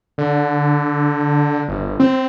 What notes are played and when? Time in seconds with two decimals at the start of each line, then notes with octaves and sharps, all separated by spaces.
0.18 D3
1.69 G1
2.00 C4